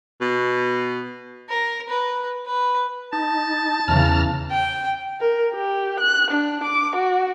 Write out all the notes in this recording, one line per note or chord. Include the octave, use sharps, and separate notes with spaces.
B2
A#4
B4
B4
D#4 A5
E2 C#3 E3 A#5 F6
G5
A#4
G4
F#6
D4
D6
F#4